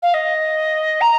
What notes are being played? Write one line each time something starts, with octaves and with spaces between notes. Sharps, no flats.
F5
D#5
A#5